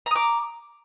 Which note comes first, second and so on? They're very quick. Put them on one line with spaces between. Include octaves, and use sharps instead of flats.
A#5 D#6 D6